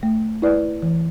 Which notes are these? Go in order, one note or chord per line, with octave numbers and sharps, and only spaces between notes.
A3
E4 B4 D5
E3